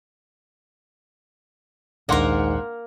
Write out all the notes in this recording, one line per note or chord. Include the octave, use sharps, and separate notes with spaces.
A#1 D#2 G#2 A#3 D4 A#4 F#5 C6